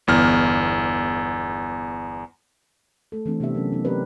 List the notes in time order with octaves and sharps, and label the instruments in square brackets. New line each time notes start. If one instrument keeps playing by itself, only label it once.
[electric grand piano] G1 E2 F6
[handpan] A3 A4
E3 A3 C4 D4
C3 B3 D4 G4 E5
F#3 C#4 A#4
B3 D#4
F#3 C4 G4 A#4 B4 D5